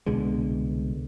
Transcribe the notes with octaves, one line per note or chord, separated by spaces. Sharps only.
C2 B2 D3 G#3